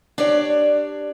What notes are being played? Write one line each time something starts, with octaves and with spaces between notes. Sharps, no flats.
D4 G4 C#5 D5